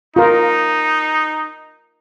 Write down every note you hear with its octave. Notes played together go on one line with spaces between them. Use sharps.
D#4 F4 A#4